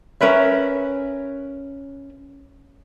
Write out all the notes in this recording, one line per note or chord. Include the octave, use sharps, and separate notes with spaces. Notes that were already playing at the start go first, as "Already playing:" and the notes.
C#4 A#4 B4 E5